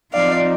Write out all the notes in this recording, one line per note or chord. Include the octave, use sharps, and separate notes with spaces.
F3 C4 D#4 D5 F5